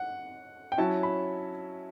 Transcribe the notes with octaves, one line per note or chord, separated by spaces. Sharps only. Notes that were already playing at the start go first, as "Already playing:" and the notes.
Already playing: F#5
G5
F#3 C#4 E4 A5
B5